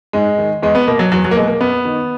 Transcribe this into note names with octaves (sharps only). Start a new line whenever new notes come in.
G#2 G#3
D#3
E2 G#3
B3
B2 A#3
F#3
E2 F#3
F#3
A#3
B2 G#3
A#3
F#2 B3
D#3